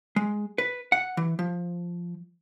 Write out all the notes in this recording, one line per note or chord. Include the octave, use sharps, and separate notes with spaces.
G#3
B4
F#5
E3
F3